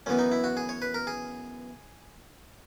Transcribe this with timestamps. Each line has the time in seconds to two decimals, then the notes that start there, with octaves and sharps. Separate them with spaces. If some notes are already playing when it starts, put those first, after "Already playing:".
0.06 F#2 E3 B3 C#4
0.19 D#4
0.32 E4
0.44 F#4
0.57 G#4
0.69 C#5
0.82 B4
0.94 A#4
1.07 G#4